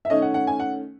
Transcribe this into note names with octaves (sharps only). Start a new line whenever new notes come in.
E5
D#3 A3 C#4 D#5
F#5
F#5
G#5
F#5